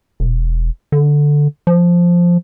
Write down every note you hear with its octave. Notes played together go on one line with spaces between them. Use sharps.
E1
D3
F3